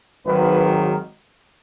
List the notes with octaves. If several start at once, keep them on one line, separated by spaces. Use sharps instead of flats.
G#1 G#2 D#3 F#3 B4